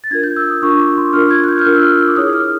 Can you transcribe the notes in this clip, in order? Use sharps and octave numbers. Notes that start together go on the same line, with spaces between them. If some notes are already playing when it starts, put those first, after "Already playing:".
A6
D4 F4 A#4 G#6
G6
E6
D#6
D4 F4 A#4 C#6
D6
C6
D4 F4 A#4 F6
G#6
F#6
G6
F6
D4 F4 A#4 F#6
E6
F6
E6
D6
E4 G#4 C#5 D#6
F6